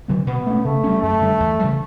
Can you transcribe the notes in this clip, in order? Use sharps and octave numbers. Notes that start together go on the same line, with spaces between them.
D3 F#3 B3
B2 B3
A3 C#4
C#3 A3
G3 C#4
F#2 A3
D3 G3
E2
C#3 E3 G3